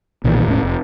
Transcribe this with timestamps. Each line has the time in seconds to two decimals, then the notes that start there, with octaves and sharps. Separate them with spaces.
0.24 B1 A#2 D#3 E3
0.46 E1 A2 B3 C#4
0.63 F1